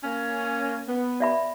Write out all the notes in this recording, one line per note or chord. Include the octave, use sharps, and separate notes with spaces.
A#3 C#4
B3
D5 E5 B5